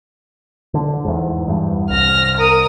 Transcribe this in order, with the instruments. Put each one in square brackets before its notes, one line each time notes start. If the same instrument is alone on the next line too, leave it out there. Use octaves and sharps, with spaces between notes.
[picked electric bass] D3
E2 G#2
E2 G2
[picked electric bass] C2 [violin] F6 A#6
[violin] A#4 D#6